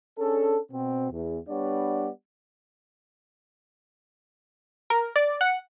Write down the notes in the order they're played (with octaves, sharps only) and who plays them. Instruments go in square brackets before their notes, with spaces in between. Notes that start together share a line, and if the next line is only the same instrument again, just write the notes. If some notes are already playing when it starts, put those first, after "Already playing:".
[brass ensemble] C#4 D4 G#4 A4
B2 C4
E2
G3 B3 D4 C#5 D5 F#5
[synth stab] A#4
D5
F#5